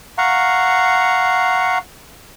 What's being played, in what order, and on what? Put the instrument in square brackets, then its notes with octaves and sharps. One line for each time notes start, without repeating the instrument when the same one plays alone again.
[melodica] F5 F#5 A#5 C#6